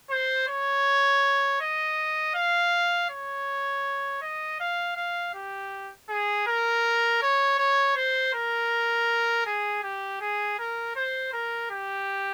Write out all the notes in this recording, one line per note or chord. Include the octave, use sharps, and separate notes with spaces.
C5
C#5
D#5
F5
C#5
D#5
F5
F5
G4
G#4
A#4
C#5
C#5
C5
A#4
G#4
G4
G#4
A#4
C5
A#4
G4